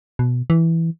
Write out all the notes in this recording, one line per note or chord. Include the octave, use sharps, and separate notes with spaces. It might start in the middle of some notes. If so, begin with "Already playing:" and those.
B2
E3